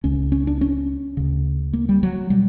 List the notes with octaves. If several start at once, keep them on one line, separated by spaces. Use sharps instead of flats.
C#2 C#3 C#4
C#4
D4
C#4
D2 C#3
A#3
G3
F#3
B2 G3